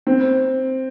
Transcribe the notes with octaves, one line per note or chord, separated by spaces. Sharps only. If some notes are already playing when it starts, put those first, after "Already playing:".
C4